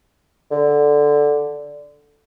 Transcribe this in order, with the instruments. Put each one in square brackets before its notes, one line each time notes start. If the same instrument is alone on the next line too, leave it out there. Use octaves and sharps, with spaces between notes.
[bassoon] D3